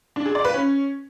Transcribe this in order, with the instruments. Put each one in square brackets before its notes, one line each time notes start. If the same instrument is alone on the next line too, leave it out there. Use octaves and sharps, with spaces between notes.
[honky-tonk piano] D4
G#4
D5
B4
C#4